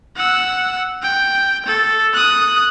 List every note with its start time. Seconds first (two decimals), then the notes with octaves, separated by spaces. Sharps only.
0.16 F#5 E6
1.03 G5
1.66 A4
2.14 D#6 F#6